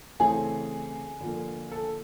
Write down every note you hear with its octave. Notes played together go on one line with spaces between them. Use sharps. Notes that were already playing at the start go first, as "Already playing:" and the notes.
C#3 E3 A3 C4 G#4
D3 F3 A#3
A4